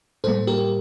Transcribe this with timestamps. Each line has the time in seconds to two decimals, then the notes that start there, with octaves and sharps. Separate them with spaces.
0.24 A2 G3 A#3 A4 C5
0.47 G4 A#4